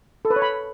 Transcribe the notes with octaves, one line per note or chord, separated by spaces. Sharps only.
A4
B4
C#5
B5